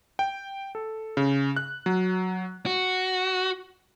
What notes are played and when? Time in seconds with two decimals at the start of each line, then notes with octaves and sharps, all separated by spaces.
0.19 G5
0.75 A4
1.17 C#3
1.56 F#6
1.86 F#3
2.66 F#4